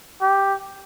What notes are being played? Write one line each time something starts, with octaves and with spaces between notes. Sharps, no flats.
G4